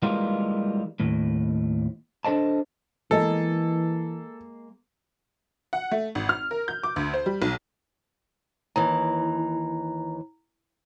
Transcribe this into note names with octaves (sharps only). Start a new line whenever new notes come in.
E3 G3 G#3 A#3 D#4 F4
D#2 A2
D4 A4 C5 D#5 A5
E3 G#3 A#3 A4 D#5
F#5
A3
G#1
F6
A#4
G6
D6
D2
C5
G3
B1
D#2 E3 A#5